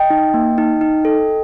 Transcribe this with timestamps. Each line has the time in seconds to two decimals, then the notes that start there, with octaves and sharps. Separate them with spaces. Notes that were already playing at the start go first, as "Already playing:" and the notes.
Already playing: D#5 G5
0.10 D#4
0.34 A#3
0.58 D#4
0.81 D#4
1.05 A4